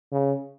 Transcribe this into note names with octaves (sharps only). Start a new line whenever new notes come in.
C#3